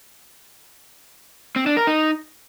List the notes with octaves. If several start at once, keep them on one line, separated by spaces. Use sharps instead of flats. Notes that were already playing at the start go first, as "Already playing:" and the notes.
C4
D4
A#4
D#4